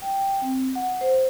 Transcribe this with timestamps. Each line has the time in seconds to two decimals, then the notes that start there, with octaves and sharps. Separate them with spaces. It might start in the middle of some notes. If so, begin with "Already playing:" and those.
0.02 G5
0.42 C4
0.75 F#5
1.01 C5